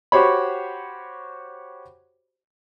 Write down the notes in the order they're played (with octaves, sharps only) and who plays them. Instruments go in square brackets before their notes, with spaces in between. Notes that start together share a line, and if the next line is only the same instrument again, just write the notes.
[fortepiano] F#4 G4 C5 C#5 B5